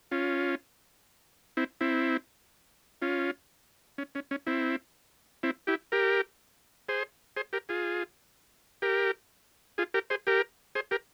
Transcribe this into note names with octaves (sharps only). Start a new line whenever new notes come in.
C#4 F4
C4 E4
C4 E4
C#4 F4
C#4
C#4
C#4
C4 E4
C4 E4
E4 G4
G4 A#4
G#4 C5
G#4 C5
G4 A#4
F4 G#4
G4 A#4
F4 G#4
G4 A#4
G#4 C5
G4 A#4
G#4 C5
G4 A#4